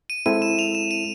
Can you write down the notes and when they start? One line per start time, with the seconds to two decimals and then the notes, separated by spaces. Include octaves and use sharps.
0.10 D#7
0.26 G#3 C4 E4 A4 D#7
0.42 E7
0.59 F7
0.75 E7
0.91 D#7